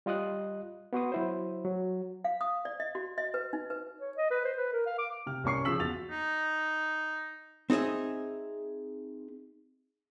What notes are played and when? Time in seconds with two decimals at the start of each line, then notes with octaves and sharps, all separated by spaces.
0.06 G3 F4 D#5 D#6 F#6
0.93 B3 F#4 C6 D#6
1.12 F#3 E4 C5
1.65 F#3
2.24 F5
2.41 D#6
2.65 D5
2.80 D#5
2.95 F#4
3.18 D#5
3.34 B4
3.53 D#4
3.70 B4
4.01 C#5
4.17 D#5
4.30 B4
4.45 C5
4.57 B4
4.73 A#4
4.86 F5
4.99 D6
5.26 C3 F6
5.44 C2 A#3 C#4 C#6 C7
5.65 C#3 F3 F4 E6 B6 F#7
5.80 E2 F#4 A6 F7
6.11 D#4
7.70 C4 D#4 G#4 D#5 E5